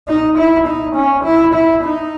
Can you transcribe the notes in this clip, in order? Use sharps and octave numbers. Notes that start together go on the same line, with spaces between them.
D#4
E4
D#4
C#4
E4
E4
D#4